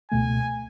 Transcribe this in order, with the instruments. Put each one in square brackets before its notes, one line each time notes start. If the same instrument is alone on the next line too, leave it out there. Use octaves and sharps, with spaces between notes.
[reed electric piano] C#2 B2 A3 [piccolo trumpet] G#5